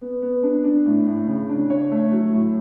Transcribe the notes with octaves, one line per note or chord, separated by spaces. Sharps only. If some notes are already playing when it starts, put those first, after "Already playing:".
B3
B3
D4
D4
A2
A2
C#3
D4
C#5
A3
F#3
A2